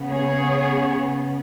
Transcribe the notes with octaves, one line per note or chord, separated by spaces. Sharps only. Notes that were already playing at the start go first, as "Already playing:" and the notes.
Already playing: C#3 B3
G#4 C#5